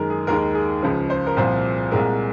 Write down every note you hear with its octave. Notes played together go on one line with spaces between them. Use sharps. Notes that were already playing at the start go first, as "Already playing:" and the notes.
Already playing: F#2 D#3 G#3 A#4
G#4
D#2 D#3 G#3 A#4
G#4
C#2 C#3 F3
C5
A#4
C2 A#2 F3 C5
C2 A#2 G#3 A#4